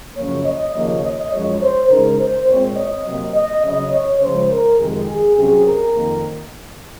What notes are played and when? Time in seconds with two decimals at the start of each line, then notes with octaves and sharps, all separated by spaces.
0.16 F#2 C#3 F3 A#3 C#5
0.45 D#5
0.74 D#2 C#3 F3 A#3 C#5
1.03 D#5
1.32 F#2 F3 G#3 C#5
1.61 C5
1.90 C#3 G#3 D#4 A#4
2.19 C5
2.47 A#2 G#3 C4 C#5
2.77 D#5
3.06 C3 F#3 A#3
3.34 D#5
3.63 C#3 F#3 C#4 D#5
3.92 C#5
4.21 C#3 F3 G#3 C5
4.50 A#4
4.79 F2 C3 D#3 G#3 G#4
5.08 G#4
5.37 C3 F#3 C#4 G#4
5.66 A#4
5.95 F2 D#3 A#3